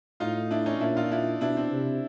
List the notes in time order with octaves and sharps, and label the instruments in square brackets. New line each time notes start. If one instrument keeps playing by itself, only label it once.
[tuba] A2 [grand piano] D#4 F4
[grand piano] D4 E4
C#4 D#4
[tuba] A#2 [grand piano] D4 E4
[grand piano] D#4 F4
D4 E4
[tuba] B2 [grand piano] D4 E4
[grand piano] C4 D4
[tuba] C3